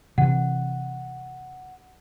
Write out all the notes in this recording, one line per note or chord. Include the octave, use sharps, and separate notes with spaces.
C3 E3 F#5